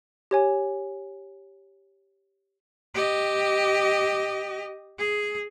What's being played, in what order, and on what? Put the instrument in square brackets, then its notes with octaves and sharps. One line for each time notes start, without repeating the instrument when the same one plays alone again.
[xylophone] G4 C#5 G#5
[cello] G4 D#5
G#4